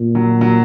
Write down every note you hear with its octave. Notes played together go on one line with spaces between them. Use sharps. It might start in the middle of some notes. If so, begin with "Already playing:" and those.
Already playing: A#2
F#3
F#3